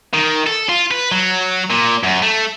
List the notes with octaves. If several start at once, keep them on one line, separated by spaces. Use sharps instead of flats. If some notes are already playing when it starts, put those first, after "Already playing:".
D#3
A4
F4
B4
F#3
A#2
F#2
A3